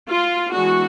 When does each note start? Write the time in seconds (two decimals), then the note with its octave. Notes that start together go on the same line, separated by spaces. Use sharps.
0.09 F4
0.51 E3 G#3 B3 D4 F#4